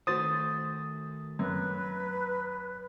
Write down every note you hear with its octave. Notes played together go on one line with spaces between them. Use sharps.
D#3 A3 F#4 C5 D#6 A6
F#2 B4